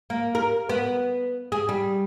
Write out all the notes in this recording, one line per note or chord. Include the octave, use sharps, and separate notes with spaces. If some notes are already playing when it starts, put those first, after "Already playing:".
A#3
A#4
B3
G#4
G3